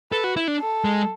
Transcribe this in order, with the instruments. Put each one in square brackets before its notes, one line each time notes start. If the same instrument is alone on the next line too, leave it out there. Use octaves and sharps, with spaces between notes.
[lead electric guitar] A4 [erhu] B4
[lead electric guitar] F#4
E4
D4
[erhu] A4
[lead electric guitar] G#3